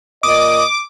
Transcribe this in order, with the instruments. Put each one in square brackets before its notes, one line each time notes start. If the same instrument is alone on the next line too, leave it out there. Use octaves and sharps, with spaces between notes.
[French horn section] A#2 A#3 D#5 [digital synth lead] D6 [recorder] D#6